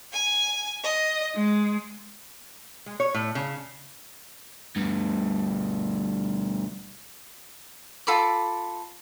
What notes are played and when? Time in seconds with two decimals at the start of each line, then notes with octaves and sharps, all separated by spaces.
0.11 G#5
0.83 D#5
1.36 G#3
2.86 G#3
3.00 C#5
3.14 A2
3.35 C#3
4.76 D2 G2
8.07 F4 A4 B5 D6